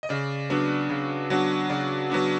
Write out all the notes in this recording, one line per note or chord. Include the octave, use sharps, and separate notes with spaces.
D#5
C#3 D5
F#3 B3 D4
C#3
F#3 B3 D4
C#3 D5
F#3 B3 D4